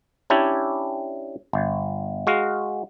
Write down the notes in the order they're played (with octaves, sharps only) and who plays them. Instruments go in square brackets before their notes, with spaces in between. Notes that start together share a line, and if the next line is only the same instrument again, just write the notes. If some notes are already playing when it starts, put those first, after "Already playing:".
[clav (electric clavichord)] C#4 D4 E4 G4 C#5 D5
G1
G#3 F#4 F5